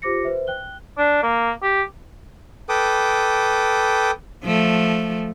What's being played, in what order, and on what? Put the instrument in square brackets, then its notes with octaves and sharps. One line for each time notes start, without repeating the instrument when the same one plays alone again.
[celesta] F4 G4 C5 D6 A#6 C#7
B4 C5 E5
G5 F#6 G7
[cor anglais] D4
A#3
G4
[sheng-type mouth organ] A4 B4 G5 D6 D#6
[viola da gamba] F3 A3